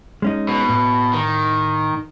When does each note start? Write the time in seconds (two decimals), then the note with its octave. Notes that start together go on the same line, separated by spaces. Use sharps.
0.22 G#3 C#4 D#4
0.49 B2
0.69 A2
1.13 D#3